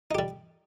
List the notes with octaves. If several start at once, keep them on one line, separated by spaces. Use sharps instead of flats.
G3 D#4 G4